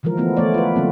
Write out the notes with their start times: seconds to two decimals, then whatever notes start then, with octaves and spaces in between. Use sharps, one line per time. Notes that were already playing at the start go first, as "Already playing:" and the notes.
0.03 D3 E3 F3 G#3 A#4
0.17 E3 F3 A3 B3 E4
0.37 E3 A3 B3 C#5 D5
0.54 F4 B4
0.76 D3 F#3 A#3 C4